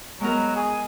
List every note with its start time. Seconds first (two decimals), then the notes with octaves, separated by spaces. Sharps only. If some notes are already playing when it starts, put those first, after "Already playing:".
0.21 F#3 G#3 B3 A#4
0.56 G#4